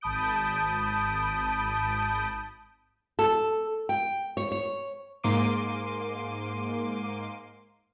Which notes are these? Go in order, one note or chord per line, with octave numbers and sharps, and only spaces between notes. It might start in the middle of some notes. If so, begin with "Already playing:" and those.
G#1 A5 B5 D#6 G6 D7
A4
G5
C#5
C#5
G#2 A#3 C6 D6 D#7